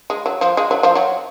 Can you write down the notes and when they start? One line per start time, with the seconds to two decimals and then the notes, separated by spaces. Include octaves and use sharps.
0.10 G#3
0.26 F#3
0.41 F3
0.57 G#3
0.71 F#3
0.83 F3
0.95 F#3